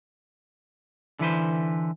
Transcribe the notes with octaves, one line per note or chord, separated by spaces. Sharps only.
D3 E3 B4 C5